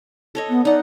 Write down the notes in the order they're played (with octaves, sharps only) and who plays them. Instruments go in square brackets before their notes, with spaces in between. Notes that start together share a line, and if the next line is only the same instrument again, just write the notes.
[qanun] A4 C#5 D#5
[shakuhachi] B3
[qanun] D#4 F#5 [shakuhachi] D5